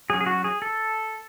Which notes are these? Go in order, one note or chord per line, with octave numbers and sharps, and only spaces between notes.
F#3 C#4 G#4
G#4
F#4
G#4
A4